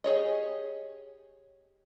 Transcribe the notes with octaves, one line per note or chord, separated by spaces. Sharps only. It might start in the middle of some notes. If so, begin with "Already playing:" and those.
G4 G#4 C#5 D#5